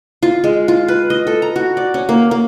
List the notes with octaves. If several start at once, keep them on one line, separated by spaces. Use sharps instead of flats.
F4
G#3
F4
B4
D#5
A4
A#5
F#4
D5
C#4
A#3
A#3